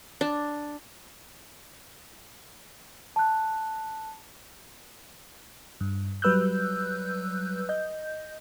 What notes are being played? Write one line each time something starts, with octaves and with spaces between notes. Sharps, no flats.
D4
A5 F#6
G2
F#3 G3 B4 E6 F#6 G6
D#5 G6